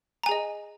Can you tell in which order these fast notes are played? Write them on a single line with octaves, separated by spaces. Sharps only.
A#5 G#5 G#4 D#5